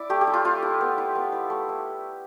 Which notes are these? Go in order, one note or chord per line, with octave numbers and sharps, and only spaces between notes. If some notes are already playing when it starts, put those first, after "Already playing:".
Already playing: E4 D5
A3 G4
G4
E4
F4
A3 F4
E4
B3
E4
B3
E4
A3
E4